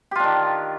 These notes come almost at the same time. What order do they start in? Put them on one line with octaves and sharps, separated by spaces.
G4 F4 D4 D#3